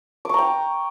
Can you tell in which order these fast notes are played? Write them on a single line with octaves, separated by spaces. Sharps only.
D6 C#6 A#5 G5